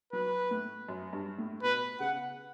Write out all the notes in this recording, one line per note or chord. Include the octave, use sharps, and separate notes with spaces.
F#3 B4
A2
F#2
G2
A2
B2 B4
C#3 F#5